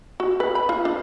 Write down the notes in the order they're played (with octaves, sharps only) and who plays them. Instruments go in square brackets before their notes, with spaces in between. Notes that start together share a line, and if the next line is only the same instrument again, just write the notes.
[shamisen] F#4
B4
B5
F4
D4